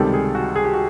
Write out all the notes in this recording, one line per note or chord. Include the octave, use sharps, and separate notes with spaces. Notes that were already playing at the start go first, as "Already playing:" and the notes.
Already playing: C#2 C3 D#3 G3 A4
G#4
F#4
G#4
G4
F#4